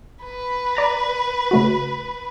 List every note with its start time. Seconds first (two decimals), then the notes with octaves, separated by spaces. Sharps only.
0.24 B4
0.75 D5 A#5 A#6
1.51 C#3 A3 F#4